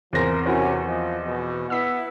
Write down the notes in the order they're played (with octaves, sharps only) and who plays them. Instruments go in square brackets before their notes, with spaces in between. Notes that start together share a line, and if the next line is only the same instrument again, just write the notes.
[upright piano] E2 C4 A#6 [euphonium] F3 [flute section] A#4 C5
[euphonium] C3 [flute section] C#4 F#4 G#5 [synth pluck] E4 A#4 C5
[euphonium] F3 [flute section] D#5
[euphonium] B2
[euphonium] B3 [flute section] E4 F#5 [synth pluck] E6 B6